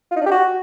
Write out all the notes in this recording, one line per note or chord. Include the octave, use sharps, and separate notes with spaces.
F4
D#4
D4
G4
F#4